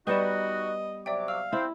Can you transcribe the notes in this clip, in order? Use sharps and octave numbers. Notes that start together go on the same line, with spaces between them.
G3 B3 D#4 F#4 G4 B4 D#5 E7
C3 F#3 D5 E5 G5 D6
F5 E6
C4 E4